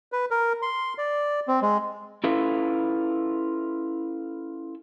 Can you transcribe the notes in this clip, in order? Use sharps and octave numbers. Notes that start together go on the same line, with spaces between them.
B4
A#4
C6
D5
C4
G#3
C#4 E4 F4 A4 B4